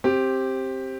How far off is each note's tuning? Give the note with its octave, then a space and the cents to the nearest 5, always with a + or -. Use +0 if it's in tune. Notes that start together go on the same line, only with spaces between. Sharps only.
C4 +15 G4 +0